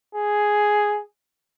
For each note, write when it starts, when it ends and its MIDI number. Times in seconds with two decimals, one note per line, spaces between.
0.15 1.02 68